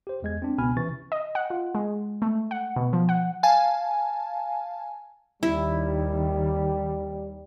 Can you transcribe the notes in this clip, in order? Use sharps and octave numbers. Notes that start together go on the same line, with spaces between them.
G4 C5
E2 G#3 G#6
C4 D4
C#2 B2 B3 G#5 B5 F6
C3 E3 C#4 C#6 A6
D#5
F#5
F4
G#3
A3
F#5
B2
F3
F#5
F5 G#5 A5
D#2 D#3 G3 E4